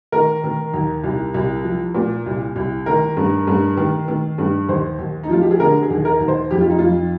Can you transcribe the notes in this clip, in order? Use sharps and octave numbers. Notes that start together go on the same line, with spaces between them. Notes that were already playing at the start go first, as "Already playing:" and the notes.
D#3 A#4
D#3
D#2
C2
C2
F3
A#2
C2
C2
D#3 A#4
G2
G2
D#3
D#3
G2
D#2 C5
D#2
D#4
F3 F4
G4
G#4
D3 A#4
G#4
D#2
A#4
D#2
C5
F2 G4
F4
D#4
F2 F4